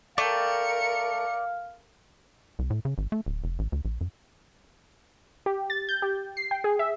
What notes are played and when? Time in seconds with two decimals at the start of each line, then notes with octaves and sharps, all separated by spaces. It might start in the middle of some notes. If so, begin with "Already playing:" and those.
0.18 A3 A#4 D5 F5 G5 C#7
2.59 C2
2.70 A2
2.85 C#3
2.98 G#1
3.12 A3
3.26 D1
3.44 F1
3.59 A1
3.72 D2
3.85 A#1
4.01 F#2
5.46 G4
5.70 A6
5.89 G6
6.02 G4
6.37 C7
6.51 G5
6.64 G#4
6.79 E5